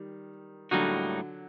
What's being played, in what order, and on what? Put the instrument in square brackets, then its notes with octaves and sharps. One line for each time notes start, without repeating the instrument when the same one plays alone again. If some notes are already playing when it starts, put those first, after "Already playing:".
Already playing: [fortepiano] D#3 G3
[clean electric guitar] A2 G3 A#3 D#4 F#4 [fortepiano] D3 F#3